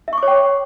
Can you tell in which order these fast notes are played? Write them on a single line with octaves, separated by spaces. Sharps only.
E5 C#6 D6 C#5 G5